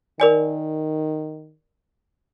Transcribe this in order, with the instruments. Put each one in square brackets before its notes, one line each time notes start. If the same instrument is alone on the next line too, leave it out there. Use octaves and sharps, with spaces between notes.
[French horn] D#3 [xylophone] A#4 D5 G#5